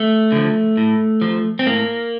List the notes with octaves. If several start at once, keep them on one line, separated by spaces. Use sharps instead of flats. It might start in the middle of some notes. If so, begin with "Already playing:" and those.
Already playing: A3
D3 F3
A2
F3
C4
A2 A#3